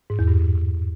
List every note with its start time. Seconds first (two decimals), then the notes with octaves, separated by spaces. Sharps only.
0.10 G#2
0.19 E2
0.28 G2